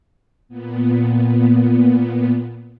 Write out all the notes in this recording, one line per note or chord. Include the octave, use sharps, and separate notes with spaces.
A#2 B3